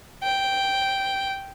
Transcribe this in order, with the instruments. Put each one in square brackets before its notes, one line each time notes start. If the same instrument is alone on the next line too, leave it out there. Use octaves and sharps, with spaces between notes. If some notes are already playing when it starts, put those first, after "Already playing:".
[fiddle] G5